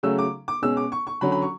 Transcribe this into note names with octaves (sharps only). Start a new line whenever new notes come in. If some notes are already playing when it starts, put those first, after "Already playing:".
C#3 F#3 A3 C#4 E6
D6
D6
B2 G#3 C#4 E6
D6
C#6
C#6
D3 F#3 C#4 B5
B5
C#6